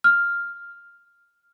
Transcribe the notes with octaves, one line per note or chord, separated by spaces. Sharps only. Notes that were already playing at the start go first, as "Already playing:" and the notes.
F6